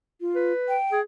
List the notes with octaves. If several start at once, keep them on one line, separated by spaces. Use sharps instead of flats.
F4
B4
G5
G#4